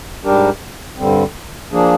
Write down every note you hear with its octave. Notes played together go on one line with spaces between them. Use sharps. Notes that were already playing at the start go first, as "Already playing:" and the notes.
G#2 G3 D4 G4 A#4
G2 D3 G3 C4
F3 A#3 D4 G#4